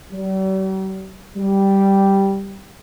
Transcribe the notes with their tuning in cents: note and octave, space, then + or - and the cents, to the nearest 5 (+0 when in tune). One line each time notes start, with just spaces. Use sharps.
G3 -45
G3 -5